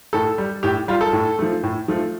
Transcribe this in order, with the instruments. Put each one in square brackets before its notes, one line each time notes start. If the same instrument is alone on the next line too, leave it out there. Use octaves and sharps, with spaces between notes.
[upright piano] A2 A4
G3
A2 G4
G3 F4
A4
A2
F3 A3
A2
F3 A3